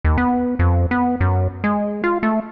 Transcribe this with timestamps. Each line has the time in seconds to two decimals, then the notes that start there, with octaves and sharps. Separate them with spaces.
0.05 D#2
0.18 B3
0.59 F2
0.91 B3
1.21 F#2
1.64 G#3
2.04 F4
2.23 A3